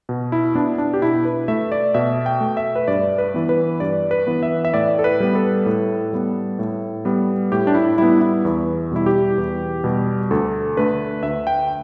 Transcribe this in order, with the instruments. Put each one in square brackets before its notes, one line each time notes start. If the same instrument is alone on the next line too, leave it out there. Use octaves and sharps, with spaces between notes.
[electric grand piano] B2
E4
B3 D4
D4
G4
B2 E4
B4
A3 E5
D5
B2 E5
G5
A3
E5
B4
G2 D5
B4
E3 B3
B4
G2 D5
B4
E3 B3
E5
E5
A2 D5
A4
B4
G3 B3
A4
A2
G3 B3
A2
G3 B3
A2 G4
D4
E4
G3 B3 E4
E4
E2
B2 G3 E4
G4
E2
B2 G3
D2 A4
D3 A3 B4
D2 E5
G5